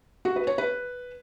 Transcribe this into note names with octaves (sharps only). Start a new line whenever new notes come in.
F#4
B4
C#5
B4